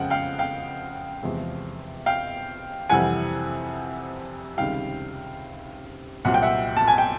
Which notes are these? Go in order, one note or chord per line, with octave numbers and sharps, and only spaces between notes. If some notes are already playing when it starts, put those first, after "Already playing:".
Already playing: F2 C#3 F3 G#3 F#5 G5
F5 G5
F5 G5
E2 C3 F3 G#3
F5 G5
F2 C3 E3 G3 F#5 G#5
C#2 C3 D#3 G3 F5 G5
C2 A#2 F#3 F#5
G5
E5 F#5
A5
G#5
G5